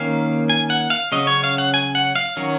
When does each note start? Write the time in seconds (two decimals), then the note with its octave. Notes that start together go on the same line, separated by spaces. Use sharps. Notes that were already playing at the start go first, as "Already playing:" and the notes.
Already playing: D#3 A#3 C#4 F5
0.50 G#5
0.70 F#5
0.90 F5
1.12 C#3 F#3 C#4 D#5
1.27 C#5
1.44 F5
1.58 F#5
1.74 G#5
1.95 F#5
2.15 F5
2.37 D#3 F#3 C#4 F#4